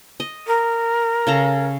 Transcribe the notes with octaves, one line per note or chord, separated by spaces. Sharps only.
D#5
A#4
C#3 A4 A#5